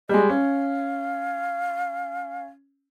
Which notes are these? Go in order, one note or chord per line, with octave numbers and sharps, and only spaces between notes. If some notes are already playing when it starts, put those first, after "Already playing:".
G3 G#3 D#5
C#4 F5